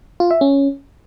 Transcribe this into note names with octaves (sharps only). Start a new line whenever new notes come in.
F4
E5
C#4